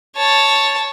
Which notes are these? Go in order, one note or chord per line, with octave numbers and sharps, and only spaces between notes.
C#5 A5